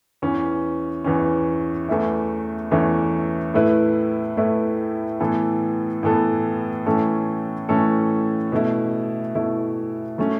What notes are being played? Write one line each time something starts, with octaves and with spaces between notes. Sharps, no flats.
E2 E3 C#4
E2 E3 C#4
E2 E3 A3 C#4 E4
E2 E3 A3 C#4 E4
A2 A3 E4 B4
A2 A3 E4 B4
A2 E3 B3 A4
A2 E3 B3 A4
A2 E3 A3 C#4 A4
A2 E3 A3 C#4 A4
B2 A3 E4
B2 A3 E4
F#3 A3 C#4